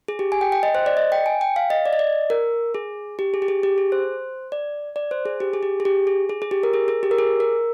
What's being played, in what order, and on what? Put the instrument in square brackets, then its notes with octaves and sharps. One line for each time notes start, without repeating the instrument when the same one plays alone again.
[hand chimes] G#4
G4
G#5
G5
G5
D#5
C5
D5
D#5
G5
G#5
G5
F5
D#5
D5
D#5
D5
A#4
G#4
G4
G#4
G4
G#4
G4
G#4
C5
D5
D5
C5
G#4
G4
G#4
G4
G#4
G4
G#4
G#4
G#4
G4
A#4
G#4
G#4
G4
A#4
G#4
A#4